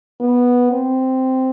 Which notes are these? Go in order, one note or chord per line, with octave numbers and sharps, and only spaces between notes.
B3
C4